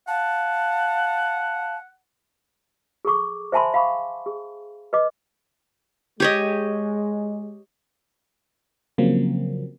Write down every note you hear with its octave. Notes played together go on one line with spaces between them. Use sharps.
F5 F#5 A5
G#4 A4 C#6 D6
C5 E5 G#5 A5 B5 C6
F5 F#5 B5 C#6 D6
G#4
B4 D#5 D6
G#3 G4 C#5 D#5
C#3 F3 F#3 A#3 C4